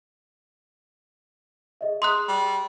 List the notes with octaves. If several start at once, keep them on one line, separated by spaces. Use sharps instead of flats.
G#4 D#5 E5
G#4 A#5 C6 D#6 F#6
G3